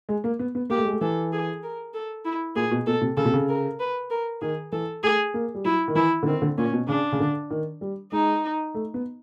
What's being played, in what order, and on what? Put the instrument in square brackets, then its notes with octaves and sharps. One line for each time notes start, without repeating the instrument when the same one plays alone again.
[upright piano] G#3
A#3
B3
B3
[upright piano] A#3 [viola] G4
[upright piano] A3
G#3
A3
[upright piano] E3 [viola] A4
[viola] G#4
A#4
A4
E4
[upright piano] A#2 [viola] G#4
[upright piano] B2
[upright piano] B2 [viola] A4
[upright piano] C3
[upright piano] C#3 [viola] A4
[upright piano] C3
C#3
[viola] A#4
B4
A#4
[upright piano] D#3 [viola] G#4
[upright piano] E3 [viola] A4
[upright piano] A3 [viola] G#4
[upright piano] A#3
G3
[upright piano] F#3 [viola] E4
[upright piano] D#3
[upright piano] E3 [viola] E4
[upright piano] D3
[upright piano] D#3 [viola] C4
[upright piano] D3
[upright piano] A#2 [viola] C#4
[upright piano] B2
[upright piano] C#3 [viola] D4
[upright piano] C#3
D3
D#3
G3
[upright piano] G#3 [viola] D#4
[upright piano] A3
B3